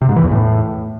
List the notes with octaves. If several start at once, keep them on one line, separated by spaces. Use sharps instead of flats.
C3
G#2
E3
E2
A2